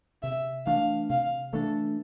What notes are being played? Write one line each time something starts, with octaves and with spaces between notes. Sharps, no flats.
C3 E5
E3 A3 D4 F5
C3 F5
E3 A3 D4 A4